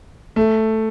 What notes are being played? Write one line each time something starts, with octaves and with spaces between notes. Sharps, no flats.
A3